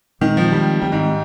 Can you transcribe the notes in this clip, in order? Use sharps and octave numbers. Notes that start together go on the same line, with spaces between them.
A#2 D#3 G#3 C4
F3
D#3 G3 G#3 C4
D#3 G3 G#3 C4
G#2